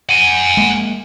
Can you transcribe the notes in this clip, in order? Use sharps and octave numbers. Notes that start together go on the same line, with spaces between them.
F#5 G#5
G#3 A#3